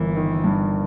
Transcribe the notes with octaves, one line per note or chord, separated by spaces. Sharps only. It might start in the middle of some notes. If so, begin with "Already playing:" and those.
Already playing: G1 G2 E3 A#3
D#3
G2